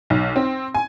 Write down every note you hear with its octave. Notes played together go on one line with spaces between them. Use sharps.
B1
C4
G#5